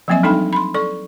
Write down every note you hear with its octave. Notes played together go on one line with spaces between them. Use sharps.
F3 F#3 A#3 C4 E5 G#5
G3 D4 D#4 A4 G5 B5
B5 C6
A4 D5 C#6